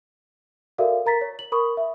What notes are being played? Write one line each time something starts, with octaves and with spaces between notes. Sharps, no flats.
F#4 A4 A#4 D5 E5 F5
A#4 A#5 A6 B6
C#5
F#7
A#4 B5 C#6 D#6
E5